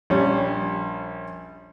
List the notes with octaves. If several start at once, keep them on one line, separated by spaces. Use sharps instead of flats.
A#1 G3 C#4